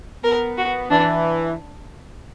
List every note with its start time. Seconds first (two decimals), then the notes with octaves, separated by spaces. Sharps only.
0.24 B3 A#4
0.58 F#4
0.91 E3 D4